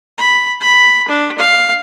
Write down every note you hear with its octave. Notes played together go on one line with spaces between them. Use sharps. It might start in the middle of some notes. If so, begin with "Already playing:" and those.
B5
B5
D4
F5